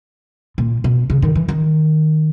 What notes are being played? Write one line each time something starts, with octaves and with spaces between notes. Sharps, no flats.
A#2
B2
C#3
D#3
E3
D#3